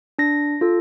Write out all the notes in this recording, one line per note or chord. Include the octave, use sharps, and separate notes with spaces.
D4 A#6
F4 A4